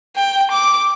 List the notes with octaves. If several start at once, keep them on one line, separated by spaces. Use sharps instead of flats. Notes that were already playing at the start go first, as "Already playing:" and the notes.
G5
D6